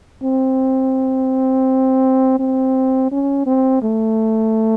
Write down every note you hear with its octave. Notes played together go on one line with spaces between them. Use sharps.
C4
C4
C#4
C4
A3